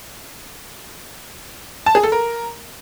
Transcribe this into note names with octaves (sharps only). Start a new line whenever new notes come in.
A5
G#4
A4
A#4